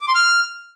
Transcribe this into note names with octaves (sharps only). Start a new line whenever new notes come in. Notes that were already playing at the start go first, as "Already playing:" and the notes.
D6
C6
F6